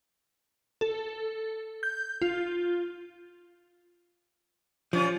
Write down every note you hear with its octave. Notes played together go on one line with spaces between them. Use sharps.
A4
G6
F4
F3 G3 C#4 F4